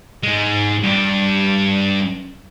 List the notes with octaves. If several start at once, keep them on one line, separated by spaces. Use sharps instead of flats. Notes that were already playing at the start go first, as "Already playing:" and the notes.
G#2 G#3
G2 D4